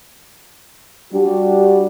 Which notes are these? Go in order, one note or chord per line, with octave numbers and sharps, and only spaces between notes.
G3 D4 F#4 G4